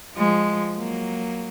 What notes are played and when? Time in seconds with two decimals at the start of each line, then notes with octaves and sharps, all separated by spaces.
0.16 F3 G#3
0.77 F#3 A#3